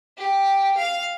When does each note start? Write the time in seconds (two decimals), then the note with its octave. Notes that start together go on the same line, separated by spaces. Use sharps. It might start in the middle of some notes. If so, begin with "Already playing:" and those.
0.17 G4
0.77 F5